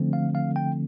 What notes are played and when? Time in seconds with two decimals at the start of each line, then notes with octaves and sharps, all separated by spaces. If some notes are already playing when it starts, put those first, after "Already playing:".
Already playing: D3 F3 A3 C4
0.13 F5
0.35 F5
0.56 G5